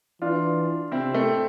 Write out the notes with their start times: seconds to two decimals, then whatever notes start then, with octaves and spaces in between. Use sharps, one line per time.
0.22 E3 D4 F4
0.91 C3 C4 E4
1.14 A3 C4